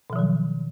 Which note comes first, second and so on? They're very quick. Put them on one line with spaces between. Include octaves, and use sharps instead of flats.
B2 F3 D#3 F#3